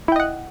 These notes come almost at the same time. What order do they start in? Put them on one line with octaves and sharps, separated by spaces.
E4 G5 D#5 F#5